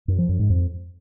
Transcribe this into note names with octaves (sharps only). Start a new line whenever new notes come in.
F#2
F3
F#2
G#2
F2